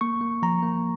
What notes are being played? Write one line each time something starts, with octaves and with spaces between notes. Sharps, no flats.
A#3 C#6
A#3
F3 A#5
A#3